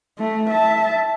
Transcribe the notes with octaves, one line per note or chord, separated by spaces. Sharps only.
A3
E5 A5